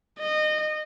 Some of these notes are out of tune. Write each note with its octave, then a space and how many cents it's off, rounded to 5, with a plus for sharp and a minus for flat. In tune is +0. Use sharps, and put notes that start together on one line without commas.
D#5 -25